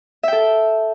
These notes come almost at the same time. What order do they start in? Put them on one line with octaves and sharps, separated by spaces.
E5 G5 A4